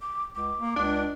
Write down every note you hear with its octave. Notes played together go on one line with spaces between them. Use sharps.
D6
C#2 D6
A#3
C#2 D4